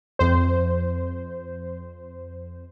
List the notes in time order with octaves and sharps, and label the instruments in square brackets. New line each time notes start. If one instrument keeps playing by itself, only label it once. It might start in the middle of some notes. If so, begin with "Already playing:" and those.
[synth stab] F2 C5